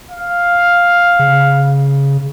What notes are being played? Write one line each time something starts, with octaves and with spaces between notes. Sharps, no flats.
F5
C#3